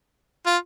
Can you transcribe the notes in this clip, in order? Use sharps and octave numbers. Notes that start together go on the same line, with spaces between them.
F4